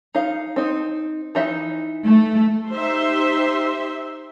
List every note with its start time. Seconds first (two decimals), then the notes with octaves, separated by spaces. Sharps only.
0.15 D#4 F5
0.56 C4 D#4
1.35 E3 D#4 E5
2.07 A3
2.71 D#4 G4 C5 E5 C6